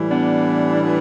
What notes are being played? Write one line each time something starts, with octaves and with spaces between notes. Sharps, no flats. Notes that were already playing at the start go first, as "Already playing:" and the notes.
Already playing: A2 E3 G3
B3 D4
B3 D4